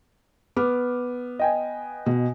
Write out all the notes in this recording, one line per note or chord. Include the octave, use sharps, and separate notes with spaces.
B3 D6 F6
D#5 G5 G#5
B2